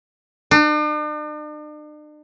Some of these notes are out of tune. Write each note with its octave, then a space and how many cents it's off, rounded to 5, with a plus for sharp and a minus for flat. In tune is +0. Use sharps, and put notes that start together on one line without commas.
D4 +45